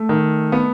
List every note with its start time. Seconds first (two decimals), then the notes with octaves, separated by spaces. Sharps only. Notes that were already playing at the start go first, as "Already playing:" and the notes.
Already playing: A3
0.09 D#3
0.52 B3